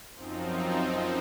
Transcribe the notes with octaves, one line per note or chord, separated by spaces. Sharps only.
F#2 F3 C4 D#4